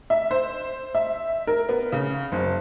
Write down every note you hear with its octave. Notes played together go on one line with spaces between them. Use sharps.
E5
C5
E5
A#4
B3
C#3
F#1